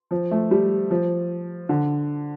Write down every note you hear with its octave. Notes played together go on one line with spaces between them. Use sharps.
F3
A3
G3
F3
D3